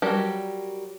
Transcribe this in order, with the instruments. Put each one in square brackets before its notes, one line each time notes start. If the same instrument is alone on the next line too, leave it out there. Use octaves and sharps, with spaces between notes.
[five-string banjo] F#3 G3 G4 A#4 A5